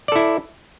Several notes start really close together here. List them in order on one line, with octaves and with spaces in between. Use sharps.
D5 A4 E4